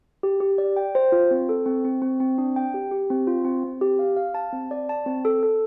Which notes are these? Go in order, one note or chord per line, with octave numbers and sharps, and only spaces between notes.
G4
G4
D5
G5
C5
F4
C4
A4
C4
C4
C4
C4
D4
G5
G4
G4
C4
F4
C4
C4
G4
F5
F5
A5
C4
D5
A5
C4
A4
A4